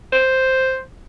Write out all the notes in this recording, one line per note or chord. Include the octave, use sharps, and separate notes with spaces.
C5